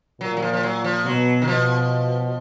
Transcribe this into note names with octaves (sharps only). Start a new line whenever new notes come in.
A#2 F#3
F#3
F3
F3
F#3
F3
B2 F#3
D#3
B2 F3